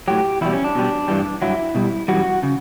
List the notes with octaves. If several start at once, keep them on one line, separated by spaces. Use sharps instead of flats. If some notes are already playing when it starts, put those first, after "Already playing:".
A2 F#3 G4
E2 B2 G3 E4
C#4
D4
B2 G3
G2 E3 G3
G2 F#3 E4
B2 G3
F#2 E3 G3 F#4
C#3